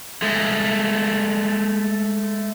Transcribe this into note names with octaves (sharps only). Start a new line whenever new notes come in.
G#3 A3